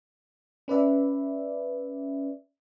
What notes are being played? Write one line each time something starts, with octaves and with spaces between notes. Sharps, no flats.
C#4 B4 D5 E5